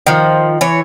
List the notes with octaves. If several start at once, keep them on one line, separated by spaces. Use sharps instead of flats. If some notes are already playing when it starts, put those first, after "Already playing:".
D#3 F3
E3 C#5